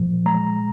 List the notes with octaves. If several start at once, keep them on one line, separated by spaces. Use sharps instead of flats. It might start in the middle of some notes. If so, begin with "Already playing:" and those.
Already playing: A#2 F3
G#3 A#5